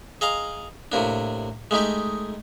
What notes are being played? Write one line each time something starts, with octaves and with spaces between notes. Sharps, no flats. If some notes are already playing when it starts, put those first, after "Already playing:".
G#4 D#5 F5 A#5
A2 C3 A#3 D4
G#3 A3 D#4 G4